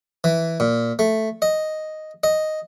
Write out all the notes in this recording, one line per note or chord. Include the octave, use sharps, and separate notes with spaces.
E3
A#2
A3
D#5
D#5